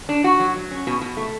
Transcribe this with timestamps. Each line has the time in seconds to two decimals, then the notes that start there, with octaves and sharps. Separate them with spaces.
0.09 D4
0.24 F#4
0.40 F#3
0.56 F#3
0.71 C#4
0.87 B2
1.01 B2
1.17 A3